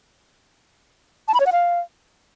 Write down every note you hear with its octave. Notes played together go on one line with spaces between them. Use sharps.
A5
B5
C#5
F#5
F5